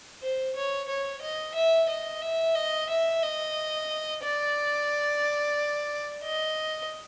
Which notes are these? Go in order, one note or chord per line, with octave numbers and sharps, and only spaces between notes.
C5
C#5
C#5
D#5
E5
D#5
E5
D#5
E5
D#5
D5
D#5